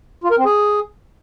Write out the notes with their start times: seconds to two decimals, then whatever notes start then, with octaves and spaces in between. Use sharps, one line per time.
0.24 F4
0.31 A#4
0.38 C4
0.45 G#4